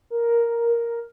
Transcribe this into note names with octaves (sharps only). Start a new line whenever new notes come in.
A#4